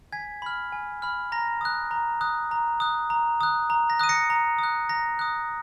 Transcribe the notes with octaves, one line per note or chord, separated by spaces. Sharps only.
G#5 G#6 B6
B5 F6
G#5
B5 F6
A#5 A#6
D#6 F#6
A#5
D#6 F#6
A#5
D#6 F#6
A#5
D#6 F#6
A#5
A#6
D#6 F#6 D#7
A#6 C#7
A#5
D#6 F#6
A#5 A#6
D#6 F#6